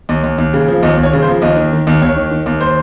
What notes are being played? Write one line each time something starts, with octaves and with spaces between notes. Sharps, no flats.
D#2
D#2
D#2
C#3
F3
D#2 D#5
D#2
C#5
C#3
C5
F3
D#2 D#5
D#3
D#3
D#2
D#2 C#5
D#3
D#3
D#2
C5